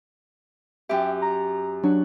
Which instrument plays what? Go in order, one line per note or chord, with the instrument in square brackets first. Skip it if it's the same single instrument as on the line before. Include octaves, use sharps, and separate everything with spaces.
[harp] F#2 G4 [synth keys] E5 G5
[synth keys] A#5
[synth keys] F#3 D4 [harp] F#4